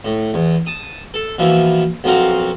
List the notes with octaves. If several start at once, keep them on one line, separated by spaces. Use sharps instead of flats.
A2
E2
A5 D#6
A4
B2 E3 F3 A#3 E4
B1 F3 A#3 C4 F#4 F5